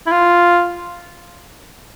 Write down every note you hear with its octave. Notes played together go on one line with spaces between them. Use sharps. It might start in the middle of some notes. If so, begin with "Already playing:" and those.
E4
F4